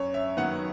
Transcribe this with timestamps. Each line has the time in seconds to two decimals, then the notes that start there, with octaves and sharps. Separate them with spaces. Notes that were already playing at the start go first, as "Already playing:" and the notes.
Already playing: F#2 C#5
0.14 E5
0.37 D#3 F#3 B3 F#5